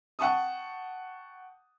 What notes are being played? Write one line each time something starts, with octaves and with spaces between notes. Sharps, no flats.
F#5 G5 A5 C#6 D#6